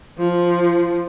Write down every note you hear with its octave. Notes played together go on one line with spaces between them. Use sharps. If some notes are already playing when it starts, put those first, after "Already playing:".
F3